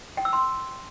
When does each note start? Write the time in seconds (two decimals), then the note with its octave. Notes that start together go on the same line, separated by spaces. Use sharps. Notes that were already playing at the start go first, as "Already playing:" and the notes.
0.17 G5
0.25 E6
0.33 C6